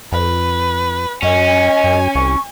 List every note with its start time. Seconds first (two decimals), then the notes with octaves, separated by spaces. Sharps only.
0.12 F2 B4
1.23 F#2 C#4 D#5 G#5
1.84 F#2
2.15 C2 C#6